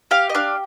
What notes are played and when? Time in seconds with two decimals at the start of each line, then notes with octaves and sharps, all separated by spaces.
0.11 G4 F5
0.29 D#5
0.35 D4 F5